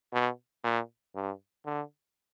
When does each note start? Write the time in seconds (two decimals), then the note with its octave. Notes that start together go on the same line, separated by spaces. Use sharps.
0.13 B2
0.64 A#2
1.15 G2
1.66 D3